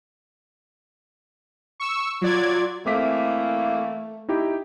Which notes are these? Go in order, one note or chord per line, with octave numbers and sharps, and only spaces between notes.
C#6 E6
F#3 F4 D5 G#6
E3 A3 A#3 C4 D6 B6
D#4 E4 G4